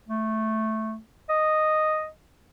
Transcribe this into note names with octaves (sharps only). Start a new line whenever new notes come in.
A3
D#5